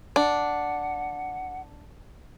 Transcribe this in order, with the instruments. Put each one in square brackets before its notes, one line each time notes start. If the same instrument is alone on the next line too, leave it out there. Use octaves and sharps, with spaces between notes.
[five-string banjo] D4 [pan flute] F#5